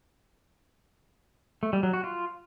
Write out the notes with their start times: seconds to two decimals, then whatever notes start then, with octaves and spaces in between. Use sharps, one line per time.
1.63 A3
1.73 G3
1.83 F#3
1.93 F#4
2.04 F4